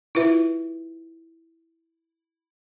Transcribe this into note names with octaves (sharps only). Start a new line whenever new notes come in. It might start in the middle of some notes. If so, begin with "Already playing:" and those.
E4 F4 B4 E5